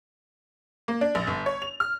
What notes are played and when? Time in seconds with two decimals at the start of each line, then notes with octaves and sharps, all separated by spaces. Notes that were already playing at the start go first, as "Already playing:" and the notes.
0.88 A#3
1.01 D4
1.15 A#1
1.27 G1
1.46 C#5
1.62 F7
1.80 F6